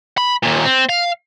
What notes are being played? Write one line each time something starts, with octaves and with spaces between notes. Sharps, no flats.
B5
D#2 A#2
C4
F5